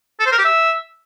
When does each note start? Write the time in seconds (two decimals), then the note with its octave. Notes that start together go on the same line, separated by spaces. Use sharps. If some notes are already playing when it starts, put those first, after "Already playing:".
0.20 A4
0.26 C5
0.32 A#4
0.38 G4
0.44 E5